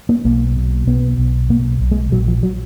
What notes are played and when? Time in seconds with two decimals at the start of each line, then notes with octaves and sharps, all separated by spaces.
0.09 A#3
0.25 B1 A#3
0.57 B2
0.87 B1 B3
1.18 B1
1.49 B2 A#3
1.80 B1
1.92 G#3
2.12 A#1 F#3
2.28 F3
2.43 F#3